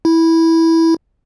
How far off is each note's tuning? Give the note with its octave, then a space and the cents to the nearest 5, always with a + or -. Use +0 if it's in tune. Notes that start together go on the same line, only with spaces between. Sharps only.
E4 -10